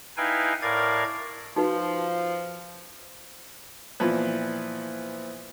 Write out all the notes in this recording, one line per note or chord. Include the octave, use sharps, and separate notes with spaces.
D#4 E4 B4 F5 G5 G#5
A2 A#4 D5 F5 G#6
F3 D#4 F#4 B4
A#2 E3 F3 B3